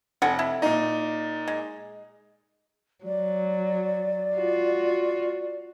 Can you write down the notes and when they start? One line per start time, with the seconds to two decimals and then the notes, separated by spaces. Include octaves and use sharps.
0.22 F1 F#5 G#5
0.39 E4
0.62 A#2 D#4
1.48 G#3
3.05 F#3 D5
4.36 F4 F#4